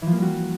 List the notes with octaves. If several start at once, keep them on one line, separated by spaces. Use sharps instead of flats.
E3
F3
A#3
G3
F#4